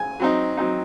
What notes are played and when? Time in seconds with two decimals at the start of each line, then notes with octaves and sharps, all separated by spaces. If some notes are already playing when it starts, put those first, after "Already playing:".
Already playing: G#5
0.20 F#3 C4 D#4
0.57 F#3 C4 D#4